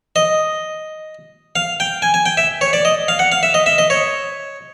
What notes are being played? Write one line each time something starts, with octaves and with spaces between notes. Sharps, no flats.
D#5
F5
G5
G#5
G#5
G5
E5
C#5
D5
D#5
F5
F#5
F5
E5
D#5
E5
D#5
C#5